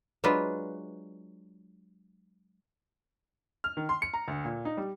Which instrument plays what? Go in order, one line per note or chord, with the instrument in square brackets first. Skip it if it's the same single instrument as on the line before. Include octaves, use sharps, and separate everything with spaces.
[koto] F#3 G#3 D4 F4 B4
[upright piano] F6
D#3
C6
C#7
A#5
D2
A#2
D#4
G3